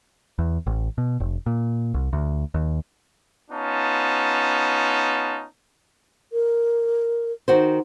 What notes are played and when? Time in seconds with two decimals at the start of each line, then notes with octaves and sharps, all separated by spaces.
0.39 E2
0.67 A1
0.98 B2
1.20 F1
1.46 A#2
1.94 C2
2.13 D2
2.54 D#2
3.50 B3 C#4 D#4 F4 A5
6.32 A#4
7.48 D#3 F#4 C5